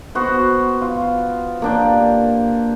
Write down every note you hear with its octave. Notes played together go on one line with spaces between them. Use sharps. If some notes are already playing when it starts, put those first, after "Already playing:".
B3 F#4 C5
F4
A#3 D4 G4